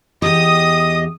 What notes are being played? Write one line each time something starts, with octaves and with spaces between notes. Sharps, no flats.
E2 G4 D#5 D#6